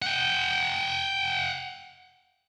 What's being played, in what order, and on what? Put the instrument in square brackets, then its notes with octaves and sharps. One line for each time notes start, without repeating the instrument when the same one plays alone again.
[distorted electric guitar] F#5 G5